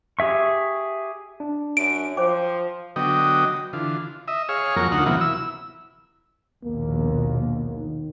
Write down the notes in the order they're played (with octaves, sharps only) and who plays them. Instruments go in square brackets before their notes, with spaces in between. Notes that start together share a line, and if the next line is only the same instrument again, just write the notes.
[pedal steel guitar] G4 G#4 E5 C#6
[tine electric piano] D4
[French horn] F#2 [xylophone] D7
[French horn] F3 [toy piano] C5 D6 [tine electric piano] G5
[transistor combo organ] D3 F#3 B3 D#5 G5
D3 E3 F4
D#5 E5
G#4 C#5 F5
F2 F#3 A#3 A#4 C#6
D2 D#4 F4 F#5
C3 E3 F#3 A#3 B3
E4 E6
[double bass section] A#1 D#2 B2 [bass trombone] A#3
[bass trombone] D#3